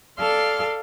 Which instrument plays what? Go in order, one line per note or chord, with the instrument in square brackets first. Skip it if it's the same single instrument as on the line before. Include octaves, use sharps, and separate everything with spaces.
[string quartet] A4 D5 F5 C6 F6